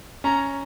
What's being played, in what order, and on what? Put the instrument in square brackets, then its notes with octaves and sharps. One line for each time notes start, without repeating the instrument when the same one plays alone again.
[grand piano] C#4 [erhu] A#5